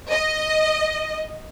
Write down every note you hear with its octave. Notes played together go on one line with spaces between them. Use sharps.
D#5